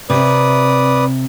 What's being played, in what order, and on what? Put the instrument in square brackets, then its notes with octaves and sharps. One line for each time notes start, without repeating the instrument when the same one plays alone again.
[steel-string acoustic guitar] C3 [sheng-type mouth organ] B4 D5 D#6